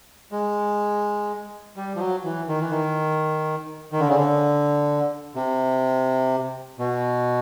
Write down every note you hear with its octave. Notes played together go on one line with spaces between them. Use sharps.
G#3
G3
F3
F#3
E3
D#3
E3
D#3
D#3
D3
C#3
D3
C3
B2